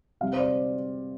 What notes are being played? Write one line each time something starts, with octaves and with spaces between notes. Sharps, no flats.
C3 G3 F5
C5
D5